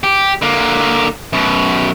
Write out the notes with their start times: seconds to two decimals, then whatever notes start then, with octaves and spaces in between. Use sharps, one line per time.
0.04 G4
0.42 D3 A#3
1.33 F#2 B2